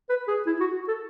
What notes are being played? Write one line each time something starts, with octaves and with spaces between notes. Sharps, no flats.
B4
G#4
E4
F#4
A4